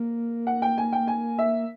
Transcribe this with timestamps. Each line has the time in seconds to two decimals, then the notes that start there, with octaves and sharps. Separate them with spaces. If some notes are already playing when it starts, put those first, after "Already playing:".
Already playing: A#3
0.47 F#5
0.62 G5
0.78 G#5
0.93 G5
1.08 G#5
1.38 E5